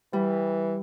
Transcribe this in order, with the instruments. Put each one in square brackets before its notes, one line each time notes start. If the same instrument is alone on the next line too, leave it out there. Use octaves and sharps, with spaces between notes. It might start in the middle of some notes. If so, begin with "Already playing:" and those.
[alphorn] E3 [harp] G3